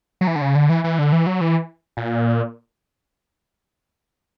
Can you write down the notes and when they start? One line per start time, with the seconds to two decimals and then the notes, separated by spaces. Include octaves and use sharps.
0.21 F#3
0.27 E3
0.36 D3
0.42 C#3
0.55 D3
0.69 E3
0.84 E3
0.99 D3
1.12 E3
1.27 F#3
1.41 E3
1.97 A#2